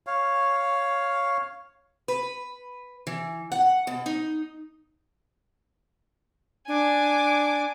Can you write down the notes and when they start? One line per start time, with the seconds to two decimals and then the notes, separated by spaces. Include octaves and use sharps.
0.07 C#5 F5
2.08 B4
3.07 E3
3.52 F#5
3.87 B2
4.06 D#4
6.68 D4 G#5 D6